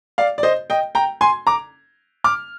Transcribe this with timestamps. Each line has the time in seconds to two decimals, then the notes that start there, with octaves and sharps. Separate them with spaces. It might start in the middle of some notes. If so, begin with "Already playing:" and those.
0.18 D5 F5
0.38 D5
0.43 C5 D#5
0.70 D#5 G5
0.95 G5 A#5
1.21 G#5 C6
1.47 A#5 D6
2.24 D6 F6